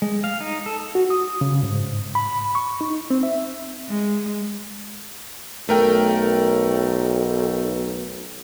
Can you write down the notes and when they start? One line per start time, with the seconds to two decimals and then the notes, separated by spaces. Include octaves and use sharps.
0.02 G#3
0.24 F5
0.41 D#4
0.66 A4
0.95 F#4
1.10 D#6
1.41 C#3
1.63 G#2
2.15 B5
2.55 C#6
2.81 D#4
3.10 C4
3.23 E5
3.88 G#3
5.69 B1 A3 A#4 G5